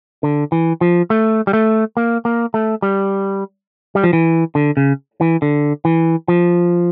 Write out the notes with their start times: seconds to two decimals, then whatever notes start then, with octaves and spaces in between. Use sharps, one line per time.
0.23 D3
0.52 E3
0.81 F3
1.10 A3
1.47 G3
1.53 A3
1.97 A#3
2.25 A#3
2.54 A3
2.82 G3
3.95 G3
4.04 F3
4.13 E3
4.55 D3
4.77 C#3
5.21 E3
5.42 D3
5.85 E3
6.28 F3